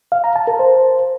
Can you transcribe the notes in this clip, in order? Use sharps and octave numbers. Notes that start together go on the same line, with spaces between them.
F5
A#5
A5
A#4
C5